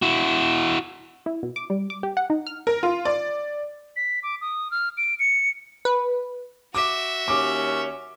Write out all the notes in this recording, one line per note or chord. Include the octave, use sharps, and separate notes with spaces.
E4 F#4
E4
B2
D6
G3
D6
G4
F#5
D#4
F6
A#4
F4
D5
B6
D6
D#6
F6
D7
C#7
B4
F#4 E5 D6
D#2 C#4 D6